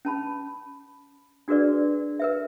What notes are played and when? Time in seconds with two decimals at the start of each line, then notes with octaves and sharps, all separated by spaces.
0.05 C#4 A5 B5
1.48 D4 F#4 G#4 A#4 B4 D5
2.19 A#4 B4 E5